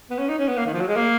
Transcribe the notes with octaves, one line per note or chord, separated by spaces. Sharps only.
B3
C#4
D#4
C#4
B3
A#3
D#3
F3
F#3
G#3
A#3